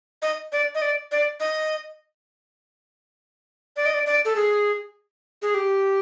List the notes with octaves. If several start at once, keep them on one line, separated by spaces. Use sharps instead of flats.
D#5
D5
D#5
D5
D5
D#5
D5
D#5
D5
D5
A4
G#4
G#4
G4